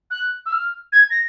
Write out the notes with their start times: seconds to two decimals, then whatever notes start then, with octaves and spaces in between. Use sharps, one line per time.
0.11 F#6
0.46 E6
0.52 F6
0.92 G#6
1.10 A#6